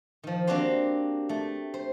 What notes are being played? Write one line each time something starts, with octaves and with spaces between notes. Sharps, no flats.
D#3 F3
A#3 C4 D4 F#4 G4 C5
A3
C5